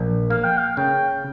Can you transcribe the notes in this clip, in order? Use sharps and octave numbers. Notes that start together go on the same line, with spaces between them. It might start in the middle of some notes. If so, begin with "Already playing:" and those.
Already playing: A#1
A#3 F5
G5
F5
C#3 G5